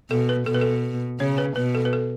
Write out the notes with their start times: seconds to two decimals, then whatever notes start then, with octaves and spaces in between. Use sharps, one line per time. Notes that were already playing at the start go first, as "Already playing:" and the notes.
0.10 B2 A4
0.29 B4
0.46 B2 A4
0.54 B4
0.61 A4
1.20 C#3 C#5
1.38 B4
1.56 B2 B4
1.75 A4
1.85 B4
1.93 A4